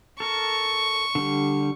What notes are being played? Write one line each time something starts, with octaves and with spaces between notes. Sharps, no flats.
A4 A#4 C#6
D3 G3